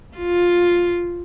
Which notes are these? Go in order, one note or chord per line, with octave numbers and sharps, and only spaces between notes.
F4